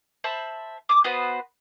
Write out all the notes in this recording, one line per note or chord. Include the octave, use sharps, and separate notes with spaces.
C5 E5 A5 B5
D6 D#6
B3 F#4 B4 C5